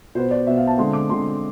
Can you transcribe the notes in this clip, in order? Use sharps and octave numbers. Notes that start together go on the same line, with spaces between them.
B2 B3 C5
D5
B2 B3 E5
F5
A5
D3 G#3 C4 C6
D6
D3 G#3 C4 C6